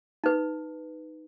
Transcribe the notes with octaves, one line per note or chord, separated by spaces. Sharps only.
D#4 B4